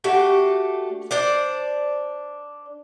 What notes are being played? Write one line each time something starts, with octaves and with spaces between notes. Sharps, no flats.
A3 D4 F#4 G4
D4 C5 D5